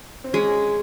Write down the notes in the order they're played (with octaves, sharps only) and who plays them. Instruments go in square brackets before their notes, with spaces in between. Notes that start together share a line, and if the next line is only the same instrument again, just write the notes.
[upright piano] C4
[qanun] G#3 [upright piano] C#4